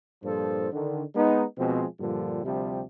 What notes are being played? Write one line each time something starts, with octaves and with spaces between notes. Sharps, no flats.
G2 A#2 F3 A4 C5
D3 D#3
G#3 B3 D#4
B2 F3 G#3 C4
G2 A#2 D3 F3 G3
D2 C3 F3 G3 G4